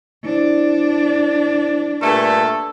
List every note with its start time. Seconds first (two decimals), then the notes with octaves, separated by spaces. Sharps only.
0.24 D4 E4 C5
2.02 G2 A#2 A3 A4